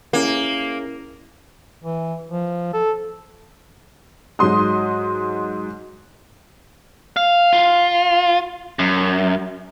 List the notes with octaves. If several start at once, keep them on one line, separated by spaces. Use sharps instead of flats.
A#3 C#4 E4 G#4
E3
F3
A4
G#2 F#3 C6 D#6
F5
F4
F#2